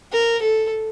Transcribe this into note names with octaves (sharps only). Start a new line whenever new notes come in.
A#4
A4